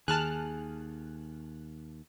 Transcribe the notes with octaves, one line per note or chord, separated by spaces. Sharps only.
D#2 D#3 G#4 A5 F6 F#6